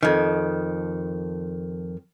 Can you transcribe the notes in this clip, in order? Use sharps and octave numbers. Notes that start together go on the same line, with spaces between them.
F2 D#3